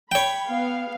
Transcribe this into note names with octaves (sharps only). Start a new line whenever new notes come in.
C#5 G5 B5
B3 F5